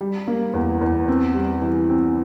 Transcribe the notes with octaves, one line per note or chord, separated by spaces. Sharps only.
G3
A#3
E2
E2
C4
G3
E3
C4